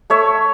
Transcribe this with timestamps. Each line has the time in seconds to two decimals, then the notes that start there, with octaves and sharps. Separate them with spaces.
0.10 A3 C#5 E5